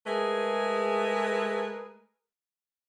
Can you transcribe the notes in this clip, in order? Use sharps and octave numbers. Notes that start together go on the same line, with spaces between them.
G#3 A3 G#4 A#4 B4